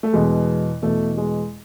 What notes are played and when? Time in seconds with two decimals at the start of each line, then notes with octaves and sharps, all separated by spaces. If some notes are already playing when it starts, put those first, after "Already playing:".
0.03 A3
0.13 E2 B2 G#3
0.82 E2 B2 A3
1.17 G#3